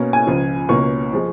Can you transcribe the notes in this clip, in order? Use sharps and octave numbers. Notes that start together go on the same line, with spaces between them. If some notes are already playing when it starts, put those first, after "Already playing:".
Already playing: B2 A#3 C#4
G#5
C#2 C#3 F3
C#2 B2 A#3 C#4 C#6
F3 G#3